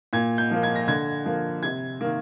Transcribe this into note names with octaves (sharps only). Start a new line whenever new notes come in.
A#2 G#6
G6
F3 A#3
G#6
A#6
D3 G#6
F3 A#3
C3 G#6
D#3 A#3